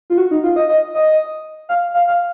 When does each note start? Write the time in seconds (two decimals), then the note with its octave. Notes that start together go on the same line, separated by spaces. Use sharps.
0.10 F4
0.18 F#4
0.31 D#4
0.44 F4
0.56 D#5
0.69 D#5
0.94 D#5
1.69 F5
1.94 F5
2.07 F5